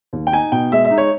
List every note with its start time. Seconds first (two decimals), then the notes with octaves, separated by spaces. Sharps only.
0.13 D#2
0.27 G5
0.32 D#4 G#5
0.52 B2 G5
0.72 G#3 E5
0.85 E5
0.91 D#4
0.98 C#5